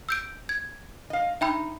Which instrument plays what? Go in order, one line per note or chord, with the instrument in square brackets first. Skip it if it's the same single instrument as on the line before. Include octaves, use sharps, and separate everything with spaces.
[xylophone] E6 G6 D7
G#6
[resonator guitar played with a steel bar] D#5 F5
[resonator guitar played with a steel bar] D#4 [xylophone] E5 G5 B5